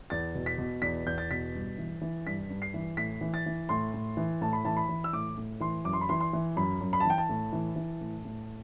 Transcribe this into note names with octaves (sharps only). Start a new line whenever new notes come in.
E2 A6
B2
B6
B2
E2 B6
E2 G6
A6
B2 B6
G2
E3
E3
G2 B6
G2
C7
E3
A2 B6
E3
A6
E3
A2 C6
A2
E3
A2 A5
B5
E3 A5
B5
E3
E6
A2 D6
A2
E3 C6
F#2 D6
C6
B5
E3 C6
C6
E3
F#2 B5
F#2
B5
A5
E3 G5
A5
A2
E3
E3
A2
A2